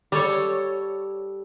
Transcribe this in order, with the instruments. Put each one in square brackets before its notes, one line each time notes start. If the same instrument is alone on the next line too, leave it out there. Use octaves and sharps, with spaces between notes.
[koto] G3 A4 C#5